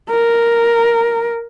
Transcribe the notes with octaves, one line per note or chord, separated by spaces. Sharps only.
A#4